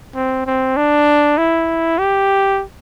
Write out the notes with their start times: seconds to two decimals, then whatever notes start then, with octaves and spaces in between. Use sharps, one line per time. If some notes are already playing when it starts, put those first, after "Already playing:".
0.15 C4
0.47 C4
0.77 D4
1.38 E4
1.98 G4